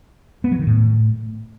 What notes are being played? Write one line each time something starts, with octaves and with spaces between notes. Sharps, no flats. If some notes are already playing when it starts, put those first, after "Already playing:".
B3
F#3
D#3
A2